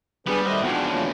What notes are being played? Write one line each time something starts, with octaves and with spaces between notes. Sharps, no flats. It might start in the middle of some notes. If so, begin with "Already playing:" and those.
G3 B3 D4 G#4 B4
D#3 A3 F#4 C5 D#5
E2 G#2 F3 D4 F#4 F#5 G5
D#3 F#3 A#3